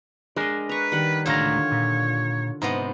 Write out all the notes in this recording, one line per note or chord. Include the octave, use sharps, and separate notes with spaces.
G#3 D4 A#4 D#5
B4 A#5 C#6
D#3 G3 F#5
C#2 A2 D3 F4 C#5 A#5
A#2
G#2 C3 B3 D#4